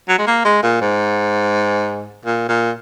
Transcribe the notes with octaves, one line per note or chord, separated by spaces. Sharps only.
F#3
G#3
A#3
G#3
A#2
G#2
A#2
A#2